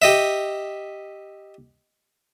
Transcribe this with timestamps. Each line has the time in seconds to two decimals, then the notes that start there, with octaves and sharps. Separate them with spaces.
0.02 G4 D#5 E5